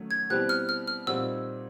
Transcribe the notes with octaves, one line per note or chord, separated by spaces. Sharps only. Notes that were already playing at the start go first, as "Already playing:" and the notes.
Already playing: D#3 F#3 A3 C#4
G#6
B2 G3 C4 E4 G4 F#6
F6
F6
F6
A#2 G3 C4 D#4 F#4 E6